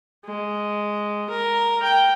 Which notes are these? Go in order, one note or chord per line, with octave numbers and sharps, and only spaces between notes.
G#3
A#4
G5